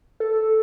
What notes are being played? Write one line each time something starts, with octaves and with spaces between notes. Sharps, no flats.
A4